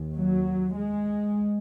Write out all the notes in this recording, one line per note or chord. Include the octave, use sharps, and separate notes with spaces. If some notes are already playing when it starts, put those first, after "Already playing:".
Already playing: D#2
F#3
G#3